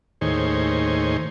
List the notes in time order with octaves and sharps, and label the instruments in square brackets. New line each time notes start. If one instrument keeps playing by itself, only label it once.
[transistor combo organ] D#2 A2 D#3 G#4 C5 C#5